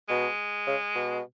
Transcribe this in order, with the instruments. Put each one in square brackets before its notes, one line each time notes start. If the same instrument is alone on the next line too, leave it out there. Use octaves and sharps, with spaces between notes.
[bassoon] B2 [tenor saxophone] G#3
[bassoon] C#3
B2